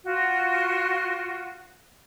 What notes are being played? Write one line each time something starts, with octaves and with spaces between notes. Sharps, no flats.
F4 F#4